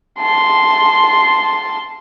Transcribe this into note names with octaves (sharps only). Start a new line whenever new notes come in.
A5 C6